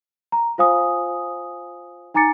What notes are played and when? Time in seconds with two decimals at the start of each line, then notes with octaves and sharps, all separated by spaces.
0.32 A#5
0.58 F4 C5 F5 G#5 D#6
2.14 D#4 G#5 A#5 D6 A6 C#7